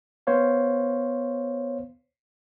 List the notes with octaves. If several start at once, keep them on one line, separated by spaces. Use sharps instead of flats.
B3 C5 C#5 F5